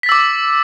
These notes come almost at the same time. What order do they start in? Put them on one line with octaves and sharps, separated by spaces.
B6 A6 E6 D6